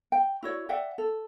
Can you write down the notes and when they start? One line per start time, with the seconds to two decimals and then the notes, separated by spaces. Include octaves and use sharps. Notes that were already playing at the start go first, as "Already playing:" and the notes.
0.12 G5
0.43 E4 F#4 C#5 D5
0.69 D5 E5 F#5 G5
0.98 A4